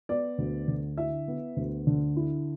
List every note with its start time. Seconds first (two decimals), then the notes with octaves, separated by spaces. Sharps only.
0.09 B3 D5
0.38 D2
0.68 D3
0.97 E4 E5
1.28 B3
1.57 D2
1.87 D3
2.16 E4